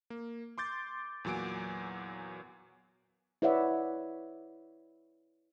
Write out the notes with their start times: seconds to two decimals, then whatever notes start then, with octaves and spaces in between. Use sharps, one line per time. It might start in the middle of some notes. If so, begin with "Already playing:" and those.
0.10 A#3
0.58 C6 D6 G6 A6
1.24 E2 A#2 F#3 G#5 D7
3.42 E4 B4 C#5 D5 E5 F#5